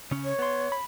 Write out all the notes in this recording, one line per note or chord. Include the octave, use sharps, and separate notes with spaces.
C#3 C#4
C#5
B3 C6
B5